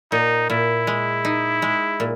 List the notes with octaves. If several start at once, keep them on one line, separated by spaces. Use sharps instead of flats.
A#2 D#4
A#2 E4
G#3
D#4
G#3
A#2